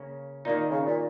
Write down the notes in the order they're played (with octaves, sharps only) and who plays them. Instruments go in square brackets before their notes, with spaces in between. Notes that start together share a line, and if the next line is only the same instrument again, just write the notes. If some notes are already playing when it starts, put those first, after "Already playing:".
Already playing: [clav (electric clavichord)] C#3 A#3 C#4
[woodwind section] A#2 [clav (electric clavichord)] D#3 A#3 D#4
[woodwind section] C#3
A#2